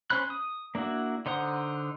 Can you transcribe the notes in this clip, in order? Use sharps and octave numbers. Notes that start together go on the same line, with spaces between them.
C#4 C5 B5 F#6
D#6
A#3 D4 E4 F#4
D3 D#4 C5 F#5 D#6